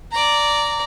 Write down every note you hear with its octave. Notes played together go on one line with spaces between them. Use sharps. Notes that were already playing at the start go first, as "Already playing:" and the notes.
D5 A#5